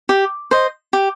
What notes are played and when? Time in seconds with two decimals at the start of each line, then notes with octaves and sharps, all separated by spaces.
0.09 G4
0.51 C5 D#5
0.93 G4